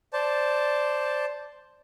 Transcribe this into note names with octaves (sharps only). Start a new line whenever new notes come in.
C5 D5 A5